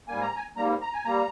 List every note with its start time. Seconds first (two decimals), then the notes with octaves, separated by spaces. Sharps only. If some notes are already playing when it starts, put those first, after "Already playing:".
0.08 G#2 G3 A#3 G#5
0.21 A#5
0.36 G#5
0.57 G#2 G3 A#3 A#5
0.81 A#5
0.93 G#5
1.05 G3 A#3 A#5